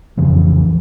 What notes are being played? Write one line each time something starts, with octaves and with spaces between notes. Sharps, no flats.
F2 C#3 E3 F3